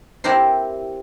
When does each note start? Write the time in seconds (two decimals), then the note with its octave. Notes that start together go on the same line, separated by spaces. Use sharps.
0.24 C4 E4 G4 A#4 C5 C6